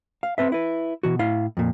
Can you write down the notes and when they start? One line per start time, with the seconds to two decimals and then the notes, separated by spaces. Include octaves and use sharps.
0.23 F5
0.38 C4 B4 E5
0.52 E4 B4
1.03 B2 E3 F#4
1.19 A2 E4 F5
1.57 F2 A#2